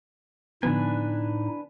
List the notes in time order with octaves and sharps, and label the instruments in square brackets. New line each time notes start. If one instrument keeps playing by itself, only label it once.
[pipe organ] A2 D#4 [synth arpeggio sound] D3 F3 B3 [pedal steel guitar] D4 B4 G#5